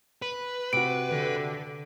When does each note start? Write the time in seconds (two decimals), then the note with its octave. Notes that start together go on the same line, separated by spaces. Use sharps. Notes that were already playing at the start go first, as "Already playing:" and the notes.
0.22 B4
0.73 C3 F#4 D7
1.10 D3